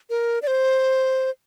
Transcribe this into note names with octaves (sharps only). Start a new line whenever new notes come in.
A#4
D5
C5